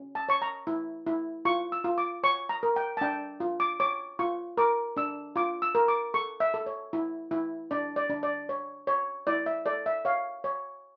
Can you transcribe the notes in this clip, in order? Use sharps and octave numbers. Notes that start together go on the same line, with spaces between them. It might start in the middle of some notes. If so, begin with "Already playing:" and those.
Already playing: C#4
A5
C#5 C#6
A#5
E4
E4
F4 C#6
E6
F4
D6
C#5 C#6
A#5
A#4
G5
A5
D4 G5
F4
D6
C#5 D6
F4 C#6
A#4 D6
D4 E6
F4 D6
E6
A#4
D6
A4 C#6
E5
A4
C#5
E4
E4
D4 D5
D5
D4
D5
C#5
C#5
E4 D5
E5
A4 D5
E5
C#5 F5
C#5